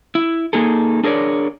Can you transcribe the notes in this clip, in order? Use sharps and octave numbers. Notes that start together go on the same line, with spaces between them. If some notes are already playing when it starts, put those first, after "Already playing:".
E4
A#3 D#4 G#4 A4
D4 G#4 A#4 C#5 D5